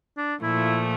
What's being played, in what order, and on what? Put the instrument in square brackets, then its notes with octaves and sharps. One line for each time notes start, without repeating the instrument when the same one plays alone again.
[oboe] D4
[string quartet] A#2 F3 A3 [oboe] E4